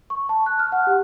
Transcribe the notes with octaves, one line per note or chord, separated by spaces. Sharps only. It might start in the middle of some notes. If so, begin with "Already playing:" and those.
C#6
A5
F#6
F6
F#5
G4